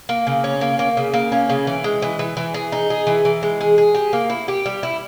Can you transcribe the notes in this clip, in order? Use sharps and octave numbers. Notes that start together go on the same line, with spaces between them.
A#3
C#3
C#4
A#3
A#3
C#3
A#3
C#4
C#3
E3
G#3
E3
E3
E3
G#4
D#4
G#4
E3
E3
G#3
G#4
G#4
G4
A#3
E4
G4
G3
E4